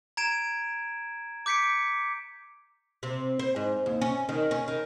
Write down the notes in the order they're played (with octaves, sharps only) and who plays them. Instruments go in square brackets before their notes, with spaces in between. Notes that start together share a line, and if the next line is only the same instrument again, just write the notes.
[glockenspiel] A#5 G#6 D7 E7
D6 G6 B6 C#7 D7
[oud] C3
C5
G#2
D#2
C#4
D#3
C#4
D#3